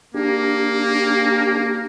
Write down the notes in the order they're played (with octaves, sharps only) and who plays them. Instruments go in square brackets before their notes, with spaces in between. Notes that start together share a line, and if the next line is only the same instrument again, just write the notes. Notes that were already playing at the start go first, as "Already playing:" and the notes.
[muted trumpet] A#3 [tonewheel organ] D4 G4